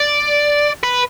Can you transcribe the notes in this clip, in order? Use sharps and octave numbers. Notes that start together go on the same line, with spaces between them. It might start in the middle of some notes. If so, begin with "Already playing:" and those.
Already playing: D5
B4